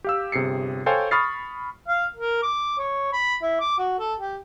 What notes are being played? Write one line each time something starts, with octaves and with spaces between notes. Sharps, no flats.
G4 F5 E6
G1 C3 G#4 C7 C#7
A4 C5 C#5 F5 G5 G#5
B5 C#6 D#6 F6 A6 C7
F5
A#4
D6
C#5
B5
E4
D6
F#4
A4
G4